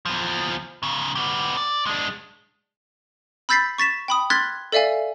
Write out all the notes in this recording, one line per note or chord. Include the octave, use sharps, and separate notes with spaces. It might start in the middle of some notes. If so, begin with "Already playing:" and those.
E2 F3
G#2 C#3
B3 G4
D5
G#3 D4
B5 E6 G6 A6 B6 C7
C#6 A6 B6 E7
G5 B5 D#6
C6 F6 F#6 G#6 A6 B6
A4 D5 E5 F5 G#5